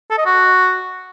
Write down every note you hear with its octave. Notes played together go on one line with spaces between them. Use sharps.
A4
D#5
F#4